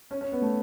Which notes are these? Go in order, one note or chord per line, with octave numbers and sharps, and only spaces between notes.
C#4
C#4
B3
A3